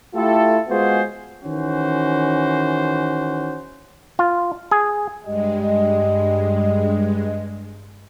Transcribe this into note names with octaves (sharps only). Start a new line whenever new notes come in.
A3 E4 F4 G4 A4
G#3 B3 F4 F#4 G#4 C5
D#3 E3 C#4 F#4 C5
F4
G#4
G2 G3 G#3 G4 D#5